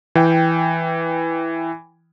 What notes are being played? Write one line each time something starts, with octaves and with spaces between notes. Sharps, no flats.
E3 G5